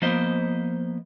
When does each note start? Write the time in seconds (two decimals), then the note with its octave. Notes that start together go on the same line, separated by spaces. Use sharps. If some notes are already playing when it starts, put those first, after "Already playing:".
0.02 F3 A#3 B3 C5 D#5